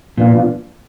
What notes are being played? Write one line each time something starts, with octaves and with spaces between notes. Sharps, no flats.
A#2 F3 B3 D4 F4